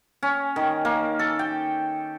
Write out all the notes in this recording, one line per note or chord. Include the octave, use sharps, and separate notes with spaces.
C#4
D#3
A#3
A4
G5